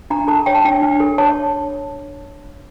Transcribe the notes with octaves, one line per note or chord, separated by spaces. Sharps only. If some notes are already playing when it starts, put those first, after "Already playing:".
D4 A#5
A4 A5
C#5 G5
A5
D4 G5
D4
A4
C#5 A5